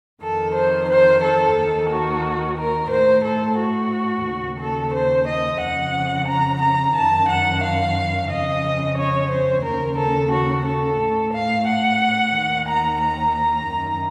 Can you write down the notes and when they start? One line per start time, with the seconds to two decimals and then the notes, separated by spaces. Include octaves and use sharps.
0.22 F2 D#3 A4
0.55 C5
0.90 C5
1.23 A4
1.57 D#2 D#3
1.90 F#4
2.57 A#4
2.91 A2 C5
3.25 A4
3.59 F#4
4.26 D#2 C#3
4.60 A4
4.94 C5
5.28 D#5
5.61 F2 C#3 F#5
6.29 A#5
6.62 A#5
6.95 F#2 D#3 A5
7.29 F#5
7.63 F5
8.30 F2 C#3 D#5
8.98 C#5
9.31 C5
9.65 D#2 C#3 A#4
9.98 A4
10.32 F#4
10.66 A4
11.00 A2
11.34 F5
11.67 F#5
12.35 D#2 D#3
12.68 A#5
13.01 A#5
13.36 A#5
13.70 F#2 D#3